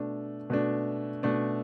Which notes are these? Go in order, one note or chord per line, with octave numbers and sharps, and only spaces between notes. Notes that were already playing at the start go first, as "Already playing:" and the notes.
Already playing: B2 A3 D4
B2 A3 D4
B2 A3 D4